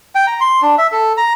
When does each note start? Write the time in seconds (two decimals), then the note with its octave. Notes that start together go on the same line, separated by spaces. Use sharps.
0.15 G5
0.27 A#5
0.41 C6
0.62 D4
0.78 E5
0.92 A4
1.17 A#5